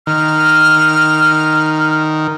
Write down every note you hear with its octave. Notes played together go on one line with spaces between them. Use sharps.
D#3 F6